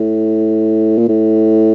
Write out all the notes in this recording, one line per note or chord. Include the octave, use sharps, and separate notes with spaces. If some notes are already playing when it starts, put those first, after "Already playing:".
Already playing: A2
A#2
A2